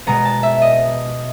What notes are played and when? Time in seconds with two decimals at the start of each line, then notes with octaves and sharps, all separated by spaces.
0.07 B2 G#3 B3 A#5
0.25 A5
0.43 E5
0.62 D#5